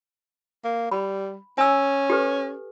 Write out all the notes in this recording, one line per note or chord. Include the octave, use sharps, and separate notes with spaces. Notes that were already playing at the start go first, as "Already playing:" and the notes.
A#3
G3 B5
C#4 G#5 E6
G4 A4 B4